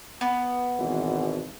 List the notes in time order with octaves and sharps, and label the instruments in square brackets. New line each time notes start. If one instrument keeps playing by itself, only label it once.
[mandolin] B3
[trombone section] G#1 B2 E3